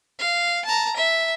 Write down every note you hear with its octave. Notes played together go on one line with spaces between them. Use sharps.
F5
A5 A#5
E5